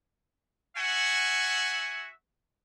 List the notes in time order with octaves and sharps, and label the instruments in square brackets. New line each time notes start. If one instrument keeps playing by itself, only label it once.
[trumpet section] F#4 E5 F#5 G#5